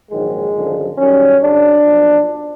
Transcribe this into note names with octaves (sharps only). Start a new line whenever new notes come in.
A#1 G#2 D#3 F#3 G#3
G#1 F#2 D3 F3
F#2 D#3 G3 C#4
F#2 C#3 F#3 D4
B1 A#2 F3